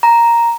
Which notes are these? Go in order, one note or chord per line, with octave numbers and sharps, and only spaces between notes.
A#5